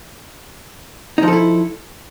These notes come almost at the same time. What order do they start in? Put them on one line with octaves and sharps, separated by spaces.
D#4 F3 A4 E4